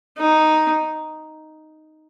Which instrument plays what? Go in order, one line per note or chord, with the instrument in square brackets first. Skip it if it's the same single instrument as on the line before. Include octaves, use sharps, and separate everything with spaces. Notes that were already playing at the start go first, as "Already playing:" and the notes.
[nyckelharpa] D#4